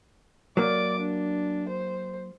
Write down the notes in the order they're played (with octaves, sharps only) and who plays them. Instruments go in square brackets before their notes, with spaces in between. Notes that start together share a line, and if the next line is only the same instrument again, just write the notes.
[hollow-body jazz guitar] F#3 A#3 [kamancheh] D5 D6
[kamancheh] D4
C5